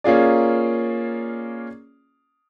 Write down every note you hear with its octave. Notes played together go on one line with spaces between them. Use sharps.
A#3 C#4 F4 G#4 D5